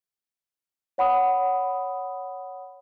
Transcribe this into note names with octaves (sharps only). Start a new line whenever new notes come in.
C#5 F#5 B5 D#6